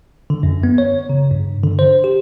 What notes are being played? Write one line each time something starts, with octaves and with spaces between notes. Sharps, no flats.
D3
F#2
B3
C#5
C#3
G2
D3
C5
G4